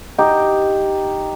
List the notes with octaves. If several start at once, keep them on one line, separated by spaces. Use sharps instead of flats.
D#4 G4